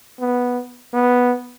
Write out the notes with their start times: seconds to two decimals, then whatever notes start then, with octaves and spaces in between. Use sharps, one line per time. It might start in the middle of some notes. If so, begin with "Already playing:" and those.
0.20 B3
0.94 B3